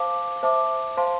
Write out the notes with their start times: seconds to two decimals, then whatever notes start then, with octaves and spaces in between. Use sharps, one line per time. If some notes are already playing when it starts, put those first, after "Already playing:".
Already playing: C5 F5 A5 D6
0.43 C5 E5 A5 D6
0.97 C5 F5 A5 C6